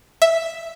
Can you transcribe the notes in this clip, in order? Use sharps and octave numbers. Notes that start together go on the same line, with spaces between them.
E5